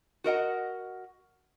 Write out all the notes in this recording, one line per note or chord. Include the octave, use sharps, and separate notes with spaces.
F#4 A#4 D#5 F#5